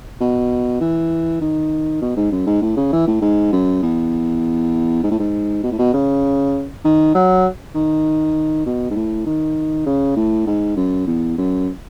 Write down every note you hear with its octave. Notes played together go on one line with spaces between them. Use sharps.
B2
E3
D#3
B2
G#2
F#2
G#2
A2
C#3
E3
A2
G#2
F#2
E2
G#2
A2
G#2
B2
A2
B2
C#3
D#3
F#3
D#3
B2
G#2
A2
D#3
C#3
A2
G#2
F#2
E2
F#2